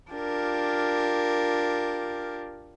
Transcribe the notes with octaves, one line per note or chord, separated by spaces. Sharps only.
D4 F4 G4 A#4